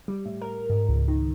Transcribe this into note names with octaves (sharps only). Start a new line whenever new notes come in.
G3
A2
A#4
G#2
C#2
D#3